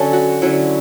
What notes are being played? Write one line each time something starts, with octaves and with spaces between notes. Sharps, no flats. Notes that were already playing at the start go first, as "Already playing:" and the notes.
Already playing: D3 F#3 C#4 A4
F#4
D3 F#3 C#4 E4